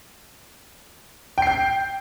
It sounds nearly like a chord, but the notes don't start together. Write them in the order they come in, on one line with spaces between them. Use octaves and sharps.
G5 C7 G6